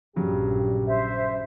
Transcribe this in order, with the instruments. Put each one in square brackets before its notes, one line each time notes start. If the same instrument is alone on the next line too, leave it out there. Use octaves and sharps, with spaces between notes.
[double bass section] A#1 G2 [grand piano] C#3 F#3 [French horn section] G4
[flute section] C5 E5